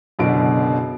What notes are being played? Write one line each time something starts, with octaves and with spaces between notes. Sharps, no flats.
F#1 F#2 B2 D3 D7